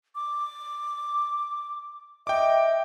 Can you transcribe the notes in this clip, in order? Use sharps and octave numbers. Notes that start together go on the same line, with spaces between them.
D6
D#5 E5 G5 D6